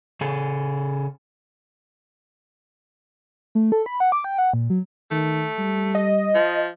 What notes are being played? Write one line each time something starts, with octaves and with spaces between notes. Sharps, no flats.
C#3 G#4 A4
A3
A4
B5
F#5
D6
G5
F#5
A#2
F#3
D#3 A3
G3
D#5
F3